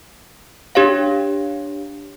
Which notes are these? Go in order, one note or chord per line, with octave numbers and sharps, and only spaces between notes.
D4 G4 C#5 F5